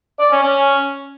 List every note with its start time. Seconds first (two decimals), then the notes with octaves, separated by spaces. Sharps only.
0.20 D5
0.31 C#4
0.42 C#4